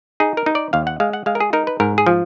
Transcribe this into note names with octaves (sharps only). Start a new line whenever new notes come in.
D#4 G#4
A#4
D#4
D5
D#2 F5
F#5
G#3 F5
F#5
G#3 F5
A#4
G#4
D#4 A#4
B4
G#2 A#4
G#4
F3